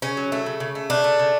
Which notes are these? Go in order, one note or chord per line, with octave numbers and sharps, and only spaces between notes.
C#3 C#4
F#3
A3
C#3
C#3
A3
C#3 D4
A3
C#3